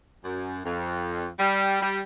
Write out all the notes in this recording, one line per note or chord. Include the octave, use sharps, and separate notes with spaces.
F#2
F2
G3
G3